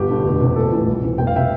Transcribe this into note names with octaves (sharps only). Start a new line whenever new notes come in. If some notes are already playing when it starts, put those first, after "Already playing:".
Already playing: G1 G4
G2 D3
F1
E2 C3
A#1 A4
A2 E3
C2
C3 E3
F1 G5
F5
C3 E5 G5